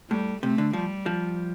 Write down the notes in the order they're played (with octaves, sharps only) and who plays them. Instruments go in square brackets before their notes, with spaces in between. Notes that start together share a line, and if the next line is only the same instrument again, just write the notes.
[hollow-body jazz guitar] A2 [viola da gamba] G3
[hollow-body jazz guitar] C3 [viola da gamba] A3
[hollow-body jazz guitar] D3
[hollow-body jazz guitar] F3 [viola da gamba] G3
[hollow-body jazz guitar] F3